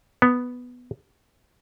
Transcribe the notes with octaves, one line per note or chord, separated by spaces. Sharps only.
B3